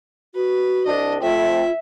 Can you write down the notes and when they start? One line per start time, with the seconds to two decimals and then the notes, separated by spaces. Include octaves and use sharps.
0.35 F#4 B4
0.86 C2 D4 D#5
1.22 F2 A3 C4 F4 E5